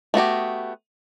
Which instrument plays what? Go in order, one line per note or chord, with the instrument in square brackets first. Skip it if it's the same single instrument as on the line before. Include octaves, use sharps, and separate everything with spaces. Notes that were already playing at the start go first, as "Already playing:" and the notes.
[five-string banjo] A3 B3 F#4 G4